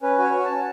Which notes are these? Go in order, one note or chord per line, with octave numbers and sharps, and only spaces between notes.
C#4 B4
F#4 C#5
F#4
A5
C#4